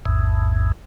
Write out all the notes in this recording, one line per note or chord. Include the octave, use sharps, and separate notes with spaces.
A1 E2 G#2